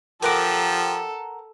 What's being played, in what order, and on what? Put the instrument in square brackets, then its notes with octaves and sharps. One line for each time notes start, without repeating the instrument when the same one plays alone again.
[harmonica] F3 G4 [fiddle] A4 [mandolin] A#4 F#5 D6